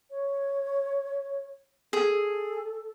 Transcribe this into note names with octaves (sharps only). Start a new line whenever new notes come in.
C#5
G#4 A4